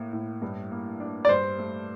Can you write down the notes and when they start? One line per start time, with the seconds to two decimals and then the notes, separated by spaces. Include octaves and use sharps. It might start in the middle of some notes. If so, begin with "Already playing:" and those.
Already playing: A2 A#3
0.13 A2
0.42 G2
0.71 A#3
1.00 D4
1.25 D5
1.29 G2 C5
1.58 A3